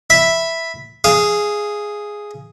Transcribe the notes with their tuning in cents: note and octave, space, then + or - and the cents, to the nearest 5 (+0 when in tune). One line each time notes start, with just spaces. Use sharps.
E5 +0 B5 +0
G#4 +0 F5 -30